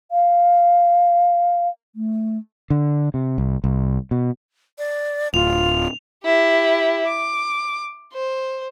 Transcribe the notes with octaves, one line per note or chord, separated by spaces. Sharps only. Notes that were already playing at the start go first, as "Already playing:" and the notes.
F5
A3
D3
C3
C2
C2
B2
D5
D1 F4 F7
E4 G4
D6
C5